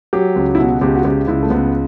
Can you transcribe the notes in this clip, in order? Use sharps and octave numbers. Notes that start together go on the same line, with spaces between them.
F#3 G4
C#2
E4
B2 F#4
C#2 G4
F#4
C#2 G4
C#2 E4
A3
C#2 B3